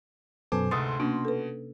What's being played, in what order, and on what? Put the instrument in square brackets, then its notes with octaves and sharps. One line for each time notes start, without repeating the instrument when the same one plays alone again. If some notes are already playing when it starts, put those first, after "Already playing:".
[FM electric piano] F#2 B2 A4 [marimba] B4 [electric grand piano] C5 G#5 D6
[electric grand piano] D2 G#2 A4 [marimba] C3 D#6 A6 [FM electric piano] C6
[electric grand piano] B2 [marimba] A#3 C#4 D4
[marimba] A4 B4